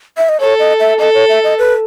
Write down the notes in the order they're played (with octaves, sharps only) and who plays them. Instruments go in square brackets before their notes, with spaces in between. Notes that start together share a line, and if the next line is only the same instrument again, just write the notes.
[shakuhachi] E5
D#5
[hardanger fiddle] A4 [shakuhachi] C#5
[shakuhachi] D#5
E5
[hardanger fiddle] A4 [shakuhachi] D#5
[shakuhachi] C#5
E5
D#5
B4